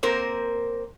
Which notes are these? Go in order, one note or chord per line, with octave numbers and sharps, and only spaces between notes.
A#3 C4 A#4 C5